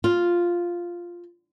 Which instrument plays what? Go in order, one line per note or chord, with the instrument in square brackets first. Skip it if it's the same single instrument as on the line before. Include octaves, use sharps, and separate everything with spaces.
[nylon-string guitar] F4